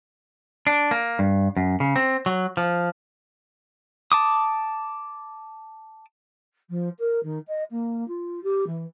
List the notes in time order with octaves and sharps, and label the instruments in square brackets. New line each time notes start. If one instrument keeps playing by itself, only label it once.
[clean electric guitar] D4
A#3
G2
F#2
C#3
C4
F#3
F3
[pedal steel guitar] A5 D6 D#6
[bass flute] F3
A#4
D#3
D#5
A#3
F4
G4
E3